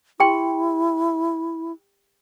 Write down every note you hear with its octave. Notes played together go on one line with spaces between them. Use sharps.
E4 G4 G5 C6